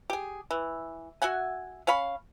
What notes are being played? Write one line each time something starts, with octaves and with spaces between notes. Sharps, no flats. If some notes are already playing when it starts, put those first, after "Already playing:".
G4 G#4
E3
F#4 E5 F#5 G#5
C#4 C#5 F5 B5